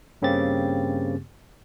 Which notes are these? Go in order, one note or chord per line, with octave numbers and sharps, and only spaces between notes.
G2 C#3 A#3 C4 G4 A6